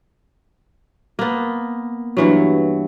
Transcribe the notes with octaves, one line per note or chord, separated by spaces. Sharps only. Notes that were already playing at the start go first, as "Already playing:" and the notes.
A#3 B3
G2 E3 F#3